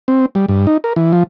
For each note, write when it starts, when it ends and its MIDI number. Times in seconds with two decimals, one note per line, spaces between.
0.08 0.26 60
0.35 0.46 55
0.49 0.66 43
0.67 0.77 63
0.84 0.93 70
0.96 1.12 52
1.13 1.23 53